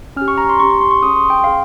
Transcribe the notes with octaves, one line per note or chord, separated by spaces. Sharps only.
C#4 G4 F6
C#6
A#5
C6
C#4 G4 C#6
C#6
C6
C#6
C#4 G#4 D#6
C6
G5
C#4 G#4 F5